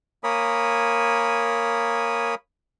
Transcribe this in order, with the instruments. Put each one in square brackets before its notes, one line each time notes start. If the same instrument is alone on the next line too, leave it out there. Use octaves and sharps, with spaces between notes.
[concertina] A#3 A#4 C#5 G#5 B5 D#6